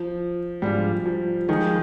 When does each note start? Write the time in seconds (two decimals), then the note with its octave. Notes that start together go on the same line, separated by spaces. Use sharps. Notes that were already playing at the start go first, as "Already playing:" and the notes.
Already playing: F3
0.62 G#2 F3 G3 G#3 D4 F4
1.06 F3
1.48 D#3 F3 G#3 D#4 G#4 D#5